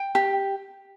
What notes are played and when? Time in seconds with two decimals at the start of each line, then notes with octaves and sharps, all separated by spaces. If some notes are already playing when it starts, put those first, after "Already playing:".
Already playing: G5
0.15 G4